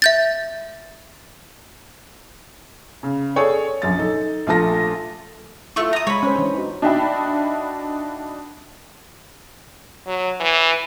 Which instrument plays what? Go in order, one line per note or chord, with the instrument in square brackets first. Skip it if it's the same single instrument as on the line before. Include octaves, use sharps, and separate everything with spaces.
[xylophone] E5 G6 A6
[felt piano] C#3
G#4 A4 C#5 D5
A#1 F#2 A6
D#4 A4
A#1 A3 F4 A5 A#6
[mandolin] A3 C#6 [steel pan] E4 F4
[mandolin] A#5 D#6
[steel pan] G#3 [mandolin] C#5 B5
[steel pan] C#4 C5
E3 D4
D#4 F#4
[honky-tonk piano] D4 D#4 F#4 E5 G5 B5
[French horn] F#3
E3